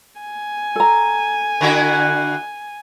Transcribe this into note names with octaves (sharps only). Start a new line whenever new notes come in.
G#5
A4 A#5
D3 E4 F#4